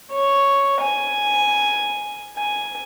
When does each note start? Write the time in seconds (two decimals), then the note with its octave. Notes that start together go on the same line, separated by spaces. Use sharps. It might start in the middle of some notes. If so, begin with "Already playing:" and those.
0.12 C#5
0.81 G#5
2.37 G#5